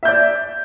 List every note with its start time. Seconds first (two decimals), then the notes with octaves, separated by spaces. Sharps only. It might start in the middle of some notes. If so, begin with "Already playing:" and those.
0.03 E5
0.05 G6
0.08 D5